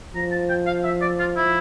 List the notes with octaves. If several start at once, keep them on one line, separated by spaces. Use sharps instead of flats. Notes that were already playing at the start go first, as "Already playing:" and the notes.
F3 A#5
A5
G5
F5
E5
D5
F4
E4